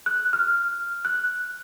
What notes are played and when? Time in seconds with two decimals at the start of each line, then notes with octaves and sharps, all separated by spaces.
0.06 F#6
0.33 F6
1.05 F#6